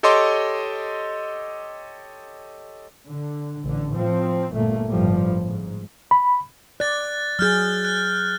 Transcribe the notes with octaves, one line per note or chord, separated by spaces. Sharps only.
G4 A4 C#5 D#5 C6 D6
D3
A1 D3
A2 F3 C4
G1 A#2 A3 A#3
G1 A2 F3 G3
G#2
B5
D5 F#6 A6
F#3 G#4 F6 G6 A6
F#6